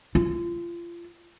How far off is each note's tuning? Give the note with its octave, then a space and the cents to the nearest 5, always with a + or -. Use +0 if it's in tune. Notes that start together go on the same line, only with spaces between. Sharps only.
F4 -30